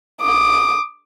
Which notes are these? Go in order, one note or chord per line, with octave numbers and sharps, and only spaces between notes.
D6 D#6